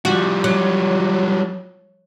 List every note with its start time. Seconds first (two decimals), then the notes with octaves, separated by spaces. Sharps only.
0.05 F3 G3 F#4
0.44 F#3